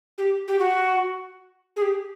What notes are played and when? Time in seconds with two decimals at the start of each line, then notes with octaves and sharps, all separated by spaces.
0.18 G4
0.48 G4
0.59 F#4
1.76 G#4
1.82 G4